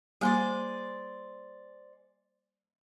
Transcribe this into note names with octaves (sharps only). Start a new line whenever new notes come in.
G3 A#3 G#4 C5 D5